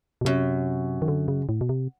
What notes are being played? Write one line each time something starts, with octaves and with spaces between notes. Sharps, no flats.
B2
F#2 C3
D#3
D3
C#3
A2
B2
C3